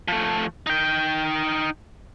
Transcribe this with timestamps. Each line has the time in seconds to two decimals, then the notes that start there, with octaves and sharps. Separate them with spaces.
0.08 F3 A3
0.67 D#4 G5